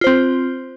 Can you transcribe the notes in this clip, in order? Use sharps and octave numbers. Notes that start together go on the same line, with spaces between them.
C4 F4 C5